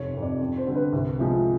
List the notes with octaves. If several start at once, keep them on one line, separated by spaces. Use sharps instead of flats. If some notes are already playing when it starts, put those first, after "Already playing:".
Already playing: F1 C#5
F2 C3
D5
F2
C5
D3 G3
B4
C2
C3 F3 G#3